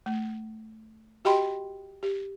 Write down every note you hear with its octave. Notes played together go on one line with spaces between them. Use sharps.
A3
F#4 G4 D#5 G5 B5 C6
G4